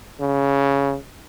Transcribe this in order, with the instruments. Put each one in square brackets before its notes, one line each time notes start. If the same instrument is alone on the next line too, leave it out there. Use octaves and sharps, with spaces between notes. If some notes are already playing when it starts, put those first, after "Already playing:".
[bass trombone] C#3